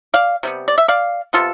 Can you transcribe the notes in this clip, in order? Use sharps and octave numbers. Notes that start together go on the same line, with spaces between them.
D5 F5
C3 G3 B3
D5
E5
D5 F5
C3 G3 B3 F4 A4